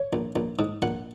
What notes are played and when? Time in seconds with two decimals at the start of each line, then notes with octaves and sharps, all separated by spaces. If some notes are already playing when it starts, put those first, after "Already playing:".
Already playing: C#5
0.13 A#1
0.36 A#1
0.59 G#2
0.82 A#1 F#5